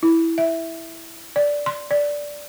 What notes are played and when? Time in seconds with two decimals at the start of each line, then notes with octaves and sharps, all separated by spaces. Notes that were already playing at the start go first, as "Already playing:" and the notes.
0.03 E4
0.38 E5
1.36 D5
1.66 C6
1.91 D5